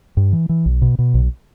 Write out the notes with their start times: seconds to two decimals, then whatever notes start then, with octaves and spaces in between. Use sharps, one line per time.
0.17 G2
0.33 E3
0.49 E3
0.66 B1
0.82 B2
0.99 B2
1.14 B1